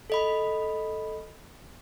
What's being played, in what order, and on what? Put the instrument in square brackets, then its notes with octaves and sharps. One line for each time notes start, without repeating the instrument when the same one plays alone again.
[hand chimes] A4 D#5 B5